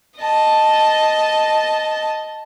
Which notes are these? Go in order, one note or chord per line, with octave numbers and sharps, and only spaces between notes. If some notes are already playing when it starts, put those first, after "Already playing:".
D#5 A5